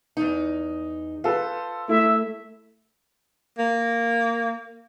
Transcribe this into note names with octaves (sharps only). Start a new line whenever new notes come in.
E2 D#4
F4 A4 B4 C5
A3 E4 E5
A#3